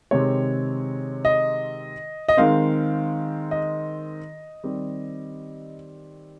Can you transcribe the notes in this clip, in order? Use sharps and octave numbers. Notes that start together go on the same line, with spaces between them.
C3 D#3 G#3 C4 C#5
D#5
D#5
D#3 G#3 C4 F5
D#5
D#3 G3 C4